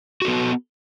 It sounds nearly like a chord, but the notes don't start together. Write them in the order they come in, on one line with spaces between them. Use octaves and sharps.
F#4 A4 B3